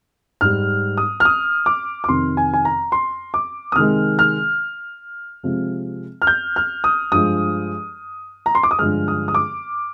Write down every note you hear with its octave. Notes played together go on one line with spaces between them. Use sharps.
G#2 G3 F6
D#6
F6
D#6
D6
D6
F2 C3 D#3 C6
G#5
G#5
A#5
C6
D6
D#6
C3 D#3 G#3 F6
F6
C3 F3 G#3
F6
G6
F6
D#6
G2 F3 G#3 D#6
A#5
C6
D6
D#6
G2 D3 F3 G#3 F6
D#6
D#6
D6